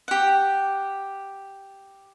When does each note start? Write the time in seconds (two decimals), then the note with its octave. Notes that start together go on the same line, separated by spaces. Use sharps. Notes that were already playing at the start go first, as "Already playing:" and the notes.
0.08 G4 F#5